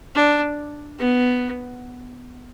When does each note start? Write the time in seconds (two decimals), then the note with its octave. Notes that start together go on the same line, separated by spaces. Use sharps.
0.15 D4
0.99 B3